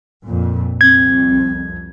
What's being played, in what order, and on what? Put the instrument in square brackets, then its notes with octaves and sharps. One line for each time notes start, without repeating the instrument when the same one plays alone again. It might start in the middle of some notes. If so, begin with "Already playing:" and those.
[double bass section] F2 A#2
[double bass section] C2 F2 [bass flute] C4 [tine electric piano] G#6